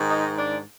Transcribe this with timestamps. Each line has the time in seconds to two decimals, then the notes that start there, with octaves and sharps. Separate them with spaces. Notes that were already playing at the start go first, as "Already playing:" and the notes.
Already playing: G#2 D#3
0.09 D#4 D#5
0.37 D4 D5